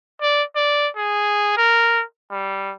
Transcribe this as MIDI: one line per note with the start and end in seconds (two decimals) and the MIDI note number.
0.22 0.43 74
0.56 0.89 74
0.96 1.56 68
1.57 2.03 70
2.31 2.74 55